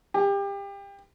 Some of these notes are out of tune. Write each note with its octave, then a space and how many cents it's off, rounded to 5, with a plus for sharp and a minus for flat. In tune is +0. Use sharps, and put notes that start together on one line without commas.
G4 +25